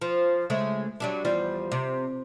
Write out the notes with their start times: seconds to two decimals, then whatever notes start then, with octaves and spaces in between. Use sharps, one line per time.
0.01 F3
0.50 C#3 G#3 A3
1.00 F#3 G3 D4
1.25 E2 F3 G3
1.72 C3